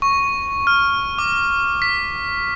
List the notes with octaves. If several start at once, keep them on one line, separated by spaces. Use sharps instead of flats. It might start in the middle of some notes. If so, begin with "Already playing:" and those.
C#6
F6
D6
B6